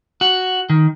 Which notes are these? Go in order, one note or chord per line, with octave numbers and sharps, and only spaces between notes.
F#4
D#3